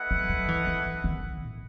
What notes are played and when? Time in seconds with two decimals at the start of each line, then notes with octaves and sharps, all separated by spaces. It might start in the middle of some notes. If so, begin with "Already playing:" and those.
Already playing: A3 E4 B4 D#5 F#5
0.11 F#3
0.29 F#3
0.49 E3
0.67 E3
1.04 D#3
1.42 A2